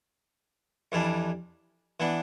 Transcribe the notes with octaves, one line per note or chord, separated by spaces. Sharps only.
F2 E3 G3 D4
E3 B3 D4